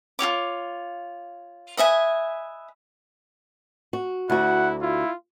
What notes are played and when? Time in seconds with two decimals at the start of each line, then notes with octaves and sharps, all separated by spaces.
0.19 F4 F#4 C#5 D6
1.77 B4 D#5 E5 G#5
3.93 F#4
4.30 D2 E4 F#4 F#5
4.82 E4 F4